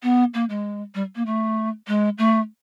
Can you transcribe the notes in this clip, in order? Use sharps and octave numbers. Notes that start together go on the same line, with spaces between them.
B3
A#3
G#3
G3
A#3
A3
G#3
A3